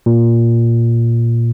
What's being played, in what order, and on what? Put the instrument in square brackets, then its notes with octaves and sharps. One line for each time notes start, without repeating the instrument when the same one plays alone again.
[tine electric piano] A#2